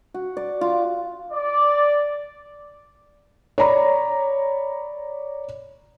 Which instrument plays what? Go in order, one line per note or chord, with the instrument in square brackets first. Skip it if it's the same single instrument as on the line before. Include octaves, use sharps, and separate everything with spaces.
[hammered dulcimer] F#4
D5
F4
[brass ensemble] D5
[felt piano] C#5 D5 A#5 B5